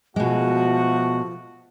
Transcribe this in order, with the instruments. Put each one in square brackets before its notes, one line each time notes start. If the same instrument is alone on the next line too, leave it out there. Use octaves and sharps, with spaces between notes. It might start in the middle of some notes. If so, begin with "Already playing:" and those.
[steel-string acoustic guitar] B2 G#3 [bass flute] F3 [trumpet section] A3 F#4